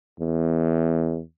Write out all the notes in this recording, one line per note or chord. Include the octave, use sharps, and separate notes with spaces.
E2